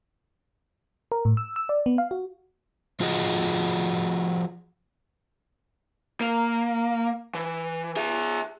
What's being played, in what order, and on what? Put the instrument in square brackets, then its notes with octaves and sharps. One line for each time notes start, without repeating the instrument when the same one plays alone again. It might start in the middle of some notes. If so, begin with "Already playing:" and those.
[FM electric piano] A#4
A2
E6
E6
D5
B3
F5
F#4
[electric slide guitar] F3 F4 F#4 G#4 D#5
[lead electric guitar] A#3
E3
G#4 E5